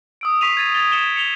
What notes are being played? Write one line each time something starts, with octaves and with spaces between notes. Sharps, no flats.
D#6 E6 D7
C#6 B6 C7 D#7 F7
G#6 A6 D#7
C#6 G#6 A6 F7 G7
D#6 G#6 C#7 E7 G7
C#7 F7 G7